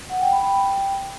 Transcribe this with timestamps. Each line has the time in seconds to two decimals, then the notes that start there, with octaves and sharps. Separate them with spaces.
0.09 F#5
0.21 G5
0.32 B5
0.44 G5